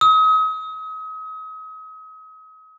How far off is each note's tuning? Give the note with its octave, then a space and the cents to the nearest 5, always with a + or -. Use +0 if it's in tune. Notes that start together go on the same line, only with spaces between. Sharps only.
D#6 +40